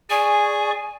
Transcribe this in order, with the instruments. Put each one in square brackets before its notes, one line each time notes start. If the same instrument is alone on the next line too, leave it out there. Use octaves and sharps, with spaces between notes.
[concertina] G#4 [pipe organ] D5 C#6 [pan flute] G#5